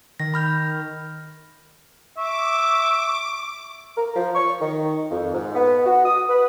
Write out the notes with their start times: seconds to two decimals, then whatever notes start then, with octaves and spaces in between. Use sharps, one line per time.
0.20 D#3 A#6
0.34 B5 F6 G6
2.17 E5 C#6 D6
3.97 A#4
4.16 F3
4.35 C#6
4.61 D#3
5.11 F2
5.34 G#2
5.55 B3
5.86 F#4
6.05 D#6
6.29 B4